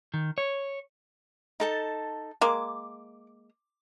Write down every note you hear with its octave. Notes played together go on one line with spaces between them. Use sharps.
D#3
C#5
D#4 A4 A5
G#3 A#3 D6